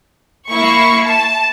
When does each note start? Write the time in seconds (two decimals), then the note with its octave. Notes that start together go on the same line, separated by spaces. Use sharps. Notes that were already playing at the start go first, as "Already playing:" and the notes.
0.50 A#3 E4 C#6
1.08 A5